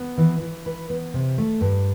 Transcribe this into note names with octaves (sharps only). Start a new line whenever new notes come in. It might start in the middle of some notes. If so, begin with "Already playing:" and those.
Already playing: B3
E3
E3
B4
B3
C3
A3
G2